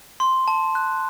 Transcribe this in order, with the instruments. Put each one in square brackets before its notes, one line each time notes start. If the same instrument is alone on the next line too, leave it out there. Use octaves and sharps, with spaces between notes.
[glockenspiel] C6
A5
F#6